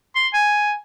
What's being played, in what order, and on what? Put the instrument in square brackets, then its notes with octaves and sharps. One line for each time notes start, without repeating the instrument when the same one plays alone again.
[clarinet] C6
G#5